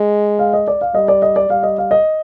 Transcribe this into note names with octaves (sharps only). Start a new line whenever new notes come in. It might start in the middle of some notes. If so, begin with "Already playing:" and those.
Already playing: G#3
F5
D#5
D5
F5
G3 D#5
D5
D#5
D5
G3 F5
D#5
F5
D#5